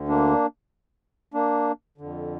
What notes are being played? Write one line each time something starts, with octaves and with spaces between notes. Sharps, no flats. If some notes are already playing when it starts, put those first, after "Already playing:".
Already playing: D2 D3
A#3 D4
A#3 D4
F2 D3